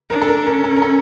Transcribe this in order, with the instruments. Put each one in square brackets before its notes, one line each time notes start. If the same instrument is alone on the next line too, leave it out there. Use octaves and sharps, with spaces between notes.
[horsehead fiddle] D4 [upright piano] A#4
[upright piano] A4
A#4
[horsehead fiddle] C#4 [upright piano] A#4
[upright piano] A4
A#4
A4